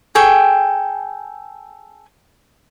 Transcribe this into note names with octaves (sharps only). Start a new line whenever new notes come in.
G#4 A4 G5 C#6